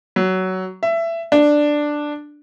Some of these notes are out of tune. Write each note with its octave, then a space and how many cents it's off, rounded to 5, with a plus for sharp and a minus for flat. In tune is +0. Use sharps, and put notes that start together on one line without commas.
F#3 +15
E5 +20
D4 +5